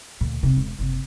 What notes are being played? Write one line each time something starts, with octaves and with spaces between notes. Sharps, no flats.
D2 A#2
D#1 C3
E1
F#1 C3